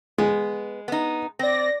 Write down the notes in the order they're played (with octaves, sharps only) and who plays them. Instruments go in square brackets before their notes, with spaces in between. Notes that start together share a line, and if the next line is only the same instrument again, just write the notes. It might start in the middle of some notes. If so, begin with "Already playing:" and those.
[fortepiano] G#3 [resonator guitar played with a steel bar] B3
[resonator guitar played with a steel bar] B3 D#4
[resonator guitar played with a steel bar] C4 [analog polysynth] D5 A#6